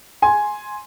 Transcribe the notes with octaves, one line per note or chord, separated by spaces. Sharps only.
G#5 C6